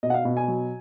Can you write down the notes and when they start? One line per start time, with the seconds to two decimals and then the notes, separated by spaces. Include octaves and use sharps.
0.03 B2 D#5
0.10 F#5
0.14 F5
0.25 B2
0.37 G#5
0.48 F#3